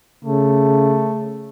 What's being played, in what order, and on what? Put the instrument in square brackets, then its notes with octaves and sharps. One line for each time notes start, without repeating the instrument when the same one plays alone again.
[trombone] C#3 [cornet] A3